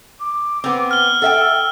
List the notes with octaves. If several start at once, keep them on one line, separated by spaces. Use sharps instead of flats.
D6
B3 C4
F6 G7
A4 E5 F#5 G5
E6